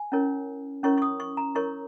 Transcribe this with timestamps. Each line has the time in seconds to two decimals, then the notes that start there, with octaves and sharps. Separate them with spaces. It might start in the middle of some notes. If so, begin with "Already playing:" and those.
Already playing: G#5
0.12 C#4 E4 A#4 C#5
0.83 C#4 E4 A#4 C#5 C#6
0.98 C#6
1.02 D#6
1.20 C#6
1.37 A#5
1.55 E4 A#4 C#5 C#6